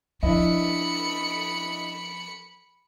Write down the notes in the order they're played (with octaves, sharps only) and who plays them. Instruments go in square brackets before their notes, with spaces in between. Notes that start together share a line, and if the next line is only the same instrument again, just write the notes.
[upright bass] F3 [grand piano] D4 E4 D#5 [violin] B5 C#7